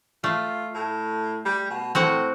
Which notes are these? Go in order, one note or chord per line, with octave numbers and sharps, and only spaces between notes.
A3 F4
A2
G3
B2
A2 C4 F#4 F#5